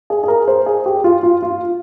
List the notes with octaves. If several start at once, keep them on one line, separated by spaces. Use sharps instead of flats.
G#4
G#4
A#4
C5
G#4
G4
F4
F4
F4